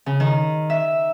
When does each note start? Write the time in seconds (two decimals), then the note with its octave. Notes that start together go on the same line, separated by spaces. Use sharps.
0.06 C#3
0.20 D#3
0.70 E5